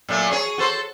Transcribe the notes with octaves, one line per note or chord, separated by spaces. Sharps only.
A#2 F#3 A3
F#4 G#4 C#5
F#4 A4 C5